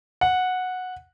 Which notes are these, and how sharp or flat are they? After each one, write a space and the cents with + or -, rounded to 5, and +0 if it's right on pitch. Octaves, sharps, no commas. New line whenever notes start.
F#5 -10